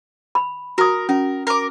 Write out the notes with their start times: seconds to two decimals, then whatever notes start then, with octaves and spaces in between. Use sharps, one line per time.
0.35 B5
0.78 F#4 A#4 D#6
1.09 C#4 A#4
1.47 A#4 D6